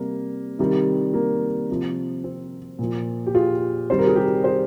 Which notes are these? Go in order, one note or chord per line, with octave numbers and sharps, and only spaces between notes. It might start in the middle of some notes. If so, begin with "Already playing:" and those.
Already playing: C3 G3 A#3
C3 D#3 G3
A#3
C3 F3
C4
A#2 F3
G4
F4 G#4
C3 D#3 G3 C5
A#4
G#4
G4 A#4
G#4 C5